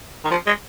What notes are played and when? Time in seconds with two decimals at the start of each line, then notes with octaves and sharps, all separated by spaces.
0.24 D#3
0.30 F3
0.47 G#3